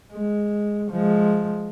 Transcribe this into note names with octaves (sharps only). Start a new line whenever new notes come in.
G#3
F3 G#3